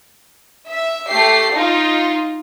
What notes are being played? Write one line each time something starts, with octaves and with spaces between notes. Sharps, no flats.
E5
A3 G4 C7
D#4 F4